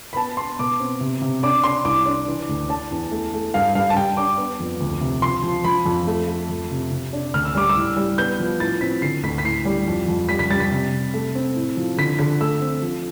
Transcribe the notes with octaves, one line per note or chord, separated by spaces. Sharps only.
B5
B3 A5
B3 C6
B2 D6
C4
C3
C3
D4 D6
D4 C6
C2 D6
D4
E3
D2
D4 A5
E2
A3
A3
G2 F5
G2 F5
A5
G3 G5
D4 D6
B3
F2
D2
C3
F3 C6
F3
F3 B5
F2
A3
A3
F2
C3
C3
D4
D2 F6
E6
G3 D6
E6
A2
G3
B3 G6
F3
A2 A6
C4 B6
D3 C7
D2 B6
B6
A2 C7
G3
F2
F2
G3 B6
B6
G3 A6
B6
C3
C3
A3
C4
A2
F3
D3 B6
D3 B6
A3 E6
C4
F3